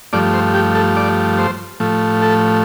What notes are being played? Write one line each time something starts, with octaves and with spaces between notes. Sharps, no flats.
G2 F3 A3 D5
C5
G4
A4
D5
C5
A2 F3 A3
A4